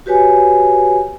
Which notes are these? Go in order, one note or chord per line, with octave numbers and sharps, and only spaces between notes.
F#4 G4 B4 C#5 G#5